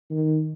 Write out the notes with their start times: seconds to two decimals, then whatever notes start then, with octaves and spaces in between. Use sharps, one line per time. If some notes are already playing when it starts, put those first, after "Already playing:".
0.10 D#3